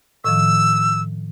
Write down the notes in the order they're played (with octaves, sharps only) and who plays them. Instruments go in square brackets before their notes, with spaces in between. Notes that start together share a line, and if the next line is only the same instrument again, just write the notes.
[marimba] A2 D#3 F3 [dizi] E6